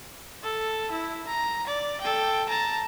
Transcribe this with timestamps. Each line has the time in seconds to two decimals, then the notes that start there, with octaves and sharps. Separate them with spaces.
0.43 A4
0.91 E4
1.27 A#5
1.67 D5
2.01 A4 G5
2.49 A5 A#5